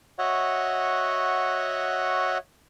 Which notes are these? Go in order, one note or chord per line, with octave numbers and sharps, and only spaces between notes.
F#4 C#5 D#5 E5 F#5